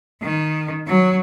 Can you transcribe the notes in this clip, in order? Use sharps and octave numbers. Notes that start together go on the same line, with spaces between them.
D#3
F#3